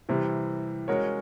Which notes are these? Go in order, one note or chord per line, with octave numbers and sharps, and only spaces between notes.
C3 E3 G3
G#3 C#4 F#4 A#4 C#5